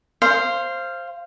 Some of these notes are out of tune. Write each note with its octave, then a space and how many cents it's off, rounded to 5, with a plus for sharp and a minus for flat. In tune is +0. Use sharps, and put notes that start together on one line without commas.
C5 +10 F5 -15